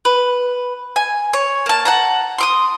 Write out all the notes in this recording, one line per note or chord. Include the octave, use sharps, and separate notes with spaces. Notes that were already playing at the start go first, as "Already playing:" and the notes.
B4
G#5
C#5
A#3 A5
F#5 A5 A#5
C6 D6 D#6